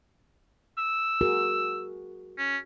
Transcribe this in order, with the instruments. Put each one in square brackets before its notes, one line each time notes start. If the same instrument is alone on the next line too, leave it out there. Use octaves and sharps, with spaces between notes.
[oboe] E6
[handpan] F#4 G#4 A#4
[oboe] C#4